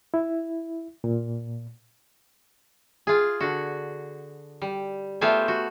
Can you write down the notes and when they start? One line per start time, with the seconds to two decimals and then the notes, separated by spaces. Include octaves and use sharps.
0.14 E4
1.04 A#2
3.07 F4 G#4
3.40 D3 F#4
4.62 G3
5.21 A3 B3 F4 G4 C5 G#5
5.48 F#4